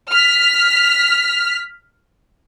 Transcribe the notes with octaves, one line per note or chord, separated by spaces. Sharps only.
F6 B6